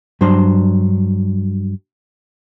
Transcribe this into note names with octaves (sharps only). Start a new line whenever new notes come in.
G2 F#3 D4 C5